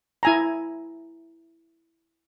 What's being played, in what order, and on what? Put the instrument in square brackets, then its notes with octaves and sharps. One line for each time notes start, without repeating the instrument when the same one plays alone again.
[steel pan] E4 G#5 A#5